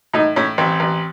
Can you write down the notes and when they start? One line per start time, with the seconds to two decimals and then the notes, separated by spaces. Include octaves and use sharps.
0.14 A2 D#4
0.36 A2 C#4
0.58 A1 C4
0.80 A1